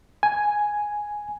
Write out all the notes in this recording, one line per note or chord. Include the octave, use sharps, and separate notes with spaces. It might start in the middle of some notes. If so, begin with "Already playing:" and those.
G#5